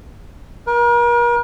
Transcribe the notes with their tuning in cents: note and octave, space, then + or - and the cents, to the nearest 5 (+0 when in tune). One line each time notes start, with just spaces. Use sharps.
A#4 +40